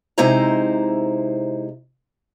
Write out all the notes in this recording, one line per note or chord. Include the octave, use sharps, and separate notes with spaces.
C3 G#3 D#4 E4 C5 A#5